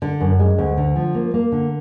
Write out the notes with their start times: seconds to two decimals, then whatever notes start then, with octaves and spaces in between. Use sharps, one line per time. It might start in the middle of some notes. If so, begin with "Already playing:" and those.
0.02 D3
0.21 F#2
0.39 G#3
0.58 D2
0.77 D3
0.96 F3
1.15 A#3
1.34 A#3
1.52 D3